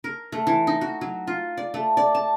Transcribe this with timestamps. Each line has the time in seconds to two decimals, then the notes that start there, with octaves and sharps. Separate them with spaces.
0.04 A#4
0.32 A3
0.47 E3
0.67 D#4
0.81 F#4
1.01 F#3
1.27 F4
1.57 D5
1.74 A3
1.97 D5
2.15 A5